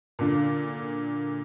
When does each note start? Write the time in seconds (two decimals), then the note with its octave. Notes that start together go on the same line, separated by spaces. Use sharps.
0.19 A#2 D3